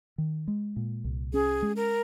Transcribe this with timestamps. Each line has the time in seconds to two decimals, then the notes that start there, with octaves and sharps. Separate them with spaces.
0.18 D#3
0.48 G#3
0.76 A#2
1.04 C2
1.33 C#4 G#4
1.62 G#3
1.76 A#4